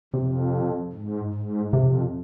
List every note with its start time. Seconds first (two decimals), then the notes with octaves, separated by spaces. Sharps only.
0.14 F2 C3
0.93 G#2
1.33 G#2
1.73 F2 C3